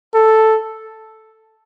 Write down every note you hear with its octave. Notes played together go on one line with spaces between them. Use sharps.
A4